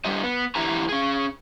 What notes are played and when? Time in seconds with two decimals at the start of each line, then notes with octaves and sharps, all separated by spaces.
0.05 G2 G3 D4 G4 D#5
0.24 B3
0.55 E2 E4 G4 G#5 A#5
0.89 C#4 G#4